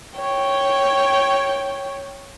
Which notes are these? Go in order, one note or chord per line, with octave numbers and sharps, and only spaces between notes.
C#5 G5